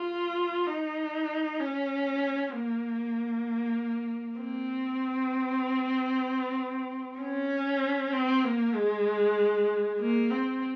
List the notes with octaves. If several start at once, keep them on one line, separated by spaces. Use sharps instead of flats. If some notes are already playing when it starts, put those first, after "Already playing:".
Already playing: F4
D#4
C#4
A#3
C4
C#4
C4
A#3
G#3
A#3
C4